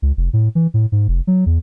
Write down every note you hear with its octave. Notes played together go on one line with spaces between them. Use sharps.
C#2
F1
A2
E3
A2
G#2
F1
F#3
E2